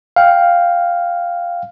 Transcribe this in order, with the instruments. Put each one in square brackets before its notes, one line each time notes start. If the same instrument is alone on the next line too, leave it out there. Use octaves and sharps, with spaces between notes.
[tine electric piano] F5 G5